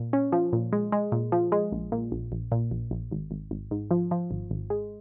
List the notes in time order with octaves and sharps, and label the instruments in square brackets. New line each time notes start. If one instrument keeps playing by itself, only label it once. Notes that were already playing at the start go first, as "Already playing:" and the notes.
Already playing: [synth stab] A#2
C#4
F3
A#2
G#3
G#3
A#2
F3
G#3
A#1
A#2
A#1
A#1
A#2
A#1
A#1
G#1
G#1
G#1
G#2
F3
F3
G#1
G#1
G#3